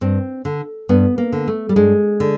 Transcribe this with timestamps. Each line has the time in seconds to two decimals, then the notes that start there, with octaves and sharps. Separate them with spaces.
0.01 G2 C4
0.45 D3
0.89 G2 B3
1.18 A#3
1.32 D3
1.47 A3
1.69 G3
1.76 G2 G#3
2.20 D3